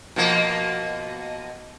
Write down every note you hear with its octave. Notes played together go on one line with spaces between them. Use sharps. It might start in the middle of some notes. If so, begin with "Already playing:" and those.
B2 F3 A#3